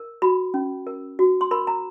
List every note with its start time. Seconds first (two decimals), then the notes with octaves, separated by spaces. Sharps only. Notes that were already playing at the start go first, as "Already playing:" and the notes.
Already playing: A#4
0.22 F#4 B5
0.54 C#4
0.87 A#4
1.19 F#4
1.41 C6
1.51 A#4 B5
1.67 A#5